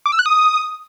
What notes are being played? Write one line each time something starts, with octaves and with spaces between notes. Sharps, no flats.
D6
E6
F#6
D#6